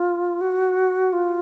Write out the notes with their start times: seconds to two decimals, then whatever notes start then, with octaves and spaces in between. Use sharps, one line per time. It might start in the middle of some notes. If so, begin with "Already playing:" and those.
Already playing: F4
0.41 F#4
1.13 F4